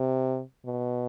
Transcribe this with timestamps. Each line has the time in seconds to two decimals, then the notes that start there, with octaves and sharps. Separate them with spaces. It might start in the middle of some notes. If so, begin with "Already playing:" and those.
Already playing: C3
0.65 B2